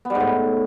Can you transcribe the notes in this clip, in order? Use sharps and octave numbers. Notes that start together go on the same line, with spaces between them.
B3
G3
G#2
A2